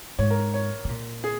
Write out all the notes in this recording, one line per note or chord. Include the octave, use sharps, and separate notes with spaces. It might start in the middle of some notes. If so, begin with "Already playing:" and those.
G#2 C#5
A#4
C#5
C#3
A#2
G#4